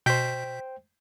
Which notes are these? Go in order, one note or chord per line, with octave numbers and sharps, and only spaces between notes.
B2 C5 G5 G6 B6